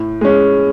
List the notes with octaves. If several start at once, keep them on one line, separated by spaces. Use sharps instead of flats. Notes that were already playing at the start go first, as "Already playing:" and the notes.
Already playing: A2
G#3 C#4